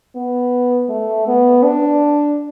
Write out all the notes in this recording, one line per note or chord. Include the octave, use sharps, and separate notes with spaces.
B3
A3
B3
D4